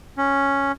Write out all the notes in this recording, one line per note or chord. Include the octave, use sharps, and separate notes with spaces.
C#4